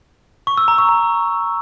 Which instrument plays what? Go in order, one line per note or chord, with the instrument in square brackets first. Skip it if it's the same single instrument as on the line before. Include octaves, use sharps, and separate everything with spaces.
[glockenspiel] C#6
E6
A#5
C#6
A#5